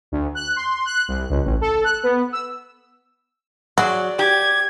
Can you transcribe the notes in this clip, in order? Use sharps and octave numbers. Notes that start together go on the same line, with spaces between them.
D2
F#6
C6
F#6
C2
C#2
A1
A4
F#6
B3
E6
F#3 F#4 G#4 D5
G4 G#6